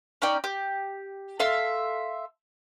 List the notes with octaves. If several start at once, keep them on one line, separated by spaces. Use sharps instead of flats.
C#4 D#4 D5 G5
G4
A4 E5 F5 C6